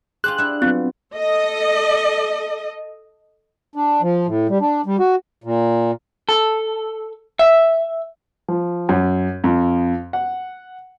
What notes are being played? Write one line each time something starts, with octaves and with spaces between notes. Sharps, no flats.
F4 G4 G#4 C5 F#6
D4 E4
F#3 B3 C4 F4
A4 D#5
D4
F3
A2
G3
D4
G3
F#4
A#2
A4
E5
F3
F#2
F2
F#5